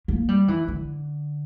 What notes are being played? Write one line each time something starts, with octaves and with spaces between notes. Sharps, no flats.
A#3
G3
E3
D3